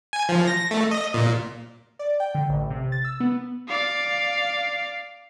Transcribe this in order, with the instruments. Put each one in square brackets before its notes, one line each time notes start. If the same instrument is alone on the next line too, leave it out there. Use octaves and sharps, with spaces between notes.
[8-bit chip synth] G#5
F3
A#6
A3
D#5
A#2
[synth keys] D5
G5
D3
A1
C3
A6
E6
B3
[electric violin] D5 F5